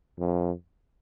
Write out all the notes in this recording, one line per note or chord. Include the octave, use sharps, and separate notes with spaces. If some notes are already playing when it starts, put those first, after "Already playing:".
F2